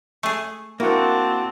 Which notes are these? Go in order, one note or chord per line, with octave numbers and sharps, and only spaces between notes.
A3 G#4
A#3 C4 D4 E4 F#4 F#5